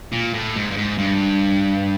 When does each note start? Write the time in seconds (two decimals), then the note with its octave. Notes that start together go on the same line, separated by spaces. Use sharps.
0.13 A#2
0.34 A2
0.55 G#2
0.70 G2
0.77 G#2
0.98 G2